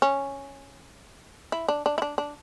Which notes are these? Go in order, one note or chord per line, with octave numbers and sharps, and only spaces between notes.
C#4
E4
D4
D4
E4
D4
D4